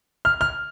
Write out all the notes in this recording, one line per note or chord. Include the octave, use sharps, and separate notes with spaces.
F6
F6